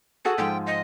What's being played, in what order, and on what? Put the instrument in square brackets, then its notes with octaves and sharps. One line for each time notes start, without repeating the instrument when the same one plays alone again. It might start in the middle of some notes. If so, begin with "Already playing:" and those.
[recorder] F#4 [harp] G#4 A4 F#5
[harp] G#2 F3 [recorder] G5
[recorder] D#5